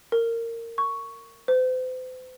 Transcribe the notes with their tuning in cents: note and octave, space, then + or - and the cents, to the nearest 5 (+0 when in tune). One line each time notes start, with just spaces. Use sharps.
A#4 -20
C#6 +5
C5 -40